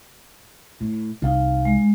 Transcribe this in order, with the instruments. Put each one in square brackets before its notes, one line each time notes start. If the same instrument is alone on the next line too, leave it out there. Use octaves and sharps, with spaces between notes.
[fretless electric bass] A2
[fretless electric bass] C2 [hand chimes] D#4 F5
[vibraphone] G#3